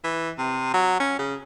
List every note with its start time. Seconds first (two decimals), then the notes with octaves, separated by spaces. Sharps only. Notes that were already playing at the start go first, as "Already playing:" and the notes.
0.04 E3
0.38 C3
0.74 F#3
1.00 C#4
1.19 C#3